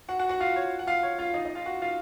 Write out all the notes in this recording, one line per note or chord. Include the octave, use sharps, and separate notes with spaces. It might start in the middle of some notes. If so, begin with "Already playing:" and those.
F#4 F#5
F#4 F#5
F#4 F#5
F4 F5
C#5
F#5
F4 F5
C#5
F4 F5
D#4 D#5
D#4 D#5
F4 F5
F#4 F#5
F4 F5